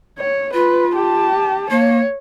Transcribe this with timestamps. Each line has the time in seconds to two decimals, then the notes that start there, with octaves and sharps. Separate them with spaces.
0.19 C#5
0.53 F4 B4
0.96 G4 A5
1.70 A#3 C#5